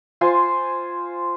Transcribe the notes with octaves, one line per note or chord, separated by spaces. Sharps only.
F4 C5 G#5 C6